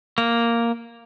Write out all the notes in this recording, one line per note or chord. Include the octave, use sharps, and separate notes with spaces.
A#3